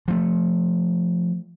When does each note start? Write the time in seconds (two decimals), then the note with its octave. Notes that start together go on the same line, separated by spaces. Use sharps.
0.08 F3 A3